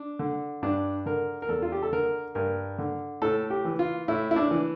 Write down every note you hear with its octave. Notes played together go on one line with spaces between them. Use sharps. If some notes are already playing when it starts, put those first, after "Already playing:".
Already playing: D4
D3
G2 D4
D3 A#4
A#4
E2 A4
F4
G4
A4
D3 A#4
G2 A#4
D3
A2 A4
G4
E3
F4
A2 E4
E4
D4
E3